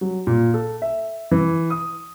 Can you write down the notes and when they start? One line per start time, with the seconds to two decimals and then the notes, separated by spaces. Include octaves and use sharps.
0.01 F#3
0.27 A#2
0.54 A4
0.82 E5
1.31 E3
1.70 D#6